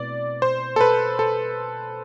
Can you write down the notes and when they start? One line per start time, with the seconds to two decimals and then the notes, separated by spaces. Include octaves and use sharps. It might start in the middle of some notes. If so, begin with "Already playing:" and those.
Already playing: B2 A3 C4 E4 D5
0.42 C5
0.76 A4
0.81 B4
1.19 A4